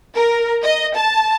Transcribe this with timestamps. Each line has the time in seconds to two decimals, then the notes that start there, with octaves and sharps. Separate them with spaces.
0.16 A#4
0.64 D#5
0.96 A5